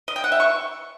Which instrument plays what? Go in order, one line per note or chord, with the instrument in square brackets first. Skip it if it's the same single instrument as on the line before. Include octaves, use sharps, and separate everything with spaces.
[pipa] D#5
G5
F#5
E5
C#6